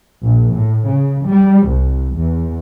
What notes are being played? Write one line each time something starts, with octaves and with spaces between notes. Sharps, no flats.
A#1
A2
C#3
G3
C2
E2